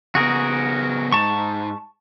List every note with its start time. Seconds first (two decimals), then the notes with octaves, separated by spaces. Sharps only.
0.15 C#3 B3 F#4 G#4 A#4
1.12 G#2 A5 C#6